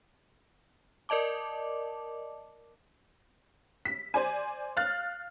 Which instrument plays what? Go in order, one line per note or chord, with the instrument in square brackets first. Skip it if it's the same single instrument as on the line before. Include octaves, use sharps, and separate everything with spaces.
[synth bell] A#4 D5 D#5 A5 D6
[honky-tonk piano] B6
C5 D5 G#5
F5 F6 F#6 A6